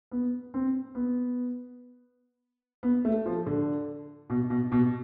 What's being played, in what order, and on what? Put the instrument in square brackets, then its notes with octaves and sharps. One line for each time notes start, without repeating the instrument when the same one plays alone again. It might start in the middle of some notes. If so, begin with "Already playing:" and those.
[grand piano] B3
C4
B3
B3
A3
F3
D3
B2
B2
B2